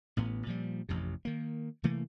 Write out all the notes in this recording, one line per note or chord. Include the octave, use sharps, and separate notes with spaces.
A1 A2 B3
A#2 F3 G3
A1 F2 C3
D#3 A#3
C3 E3 A3 A#3